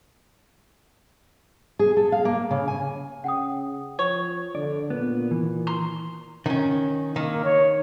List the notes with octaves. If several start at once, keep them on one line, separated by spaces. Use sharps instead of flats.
G#4
A4
F5
A#3
C#3
G#5
C#3 F#5 G5 D#6
F3 C#5
D3 D5
A#2 B3
E3
A#5 C6
D#3 C#4
D#3 A#3
C#5